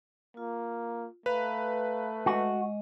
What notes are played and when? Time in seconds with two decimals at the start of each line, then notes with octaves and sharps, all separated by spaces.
0.37 A#3 F4
1.26 A3 B4 F5 A#5 B5
2.26 G#3 F#4 D#5